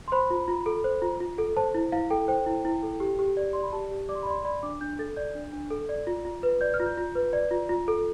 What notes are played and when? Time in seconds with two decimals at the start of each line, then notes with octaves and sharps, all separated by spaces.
0.08 C6
0.12 C5 B5
0.30 F4
0.48 F4
0.66 A4
0.84 C5
1.02 F4
1.20 F4
1.38 A4
1.56 C5 A5
1.75 E4
1.92 E4 F5
2.10 A4 G5
2.28 C5 G5
2.46 E4
2.65 E4
2.83 A4
3.00 G4
3.19 G4
3.37 D5
3.53 D5 C6
3.63 B5
3.73 G4 A5
3.91 G4
4.09 D5 D6
4.15 C6
4.23 B5
4.27 D5 C6
4.38 C6
4.45 D5 B5
4.63 D4 D6
4.81 D4 G6
4.99 A4 A6
5.16 D5 G6
5.35 D4
5.53 D4
5.70 A4
5.89 D5
6.07 F4
6.25 F4
6.43 B4
6.61 D5 G6
6.74 F6
6.80 F4
6.86 G6
6.97 F4
7.15 B4
7.33 D5
7.51 F4
7.69 F4
7.88 A4